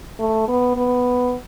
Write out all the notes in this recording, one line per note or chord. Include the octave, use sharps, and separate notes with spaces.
A3
B3
B3